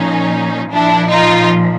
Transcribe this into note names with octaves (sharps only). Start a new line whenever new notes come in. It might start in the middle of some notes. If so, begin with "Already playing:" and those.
Already playing: A#2 F3 C#4 D#4
A#2 F3 D4 E4
D#4 F4